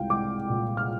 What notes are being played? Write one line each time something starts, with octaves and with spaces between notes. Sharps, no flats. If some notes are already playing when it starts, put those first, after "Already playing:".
Already playing: C2 G#3 F5 G5
G#3 D6
A#2
F6